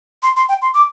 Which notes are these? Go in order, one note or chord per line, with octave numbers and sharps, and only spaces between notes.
C6
C6
G5
C6
D6